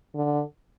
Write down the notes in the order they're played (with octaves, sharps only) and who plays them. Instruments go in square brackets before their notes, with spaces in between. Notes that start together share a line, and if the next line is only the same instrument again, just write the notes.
[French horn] D3